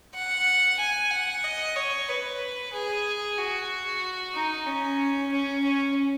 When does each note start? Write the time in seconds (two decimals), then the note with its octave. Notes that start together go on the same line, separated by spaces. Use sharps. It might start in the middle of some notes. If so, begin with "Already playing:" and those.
0.15 F#5
0.79 G#5
1.11 F#5
1.44 D#5
1.76 C#5
2.09 B4
2.73 G#4
3.38 F#4
4.34 D#4
4.66 C#4
5.32 C#4
5.64 C#4